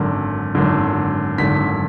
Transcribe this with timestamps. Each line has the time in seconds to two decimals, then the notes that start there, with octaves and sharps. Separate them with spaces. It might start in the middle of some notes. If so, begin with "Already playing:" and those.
Already playing: G#1 F#2 D3
0.55 G#1 F#2 D3
1.38 G#1 F#2 D3 B6